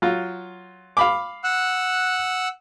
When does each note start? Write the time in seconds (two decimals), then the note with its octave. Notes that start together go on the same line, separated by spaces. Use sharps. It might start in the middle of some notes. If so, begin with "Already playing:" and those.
0.02 F#3 F4
0.97 F5 B5 D6
1.44 F#5 E6 F#6